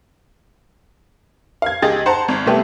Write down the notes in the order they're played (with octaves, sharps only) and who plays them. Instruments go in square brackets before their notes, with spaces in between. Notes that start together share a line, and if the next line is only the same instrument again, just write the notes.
[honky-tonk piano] F5 G#6
C#2 G4 G#4 D#5 G5 A6
C5 F#5 A5 A#5 C6
G#1
C2 C3 A3 B3 G4